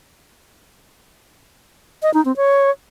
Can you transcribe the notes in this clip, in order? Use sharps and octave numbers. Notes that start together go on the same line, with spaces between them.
D#5
D#4
C4
C#5